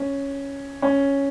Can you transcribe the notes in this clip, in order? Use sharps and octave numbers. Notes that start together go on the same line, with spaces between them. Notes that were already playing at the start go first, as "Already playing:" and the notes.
Already playing: C#4
C#4